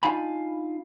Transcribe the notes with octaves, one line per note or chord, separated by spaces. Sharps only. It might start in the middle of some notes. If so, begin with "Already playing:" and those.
D4 D#4 F4 F5 G#5 B5